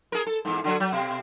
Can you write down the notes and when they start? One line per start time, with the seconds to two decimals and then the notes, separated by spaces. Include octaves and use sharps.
0.12 G#4 A#4
0.27 A4
0.45 E2 G#2
0.64 D3 F#3 F#4
0.80 F#3
0.92 B2